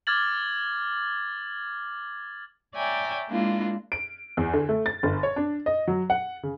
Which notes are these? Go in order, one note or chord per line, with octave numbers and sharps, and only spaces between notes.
D6 F6 G#6 A6 F#7
C#5 D5 E5 G5 G#5 A#5
G#3 A#3 D4 E4 F4
D7
E2
D3
A3
A6
G1
C#5
D4
D#5
F#3
F#5
C#3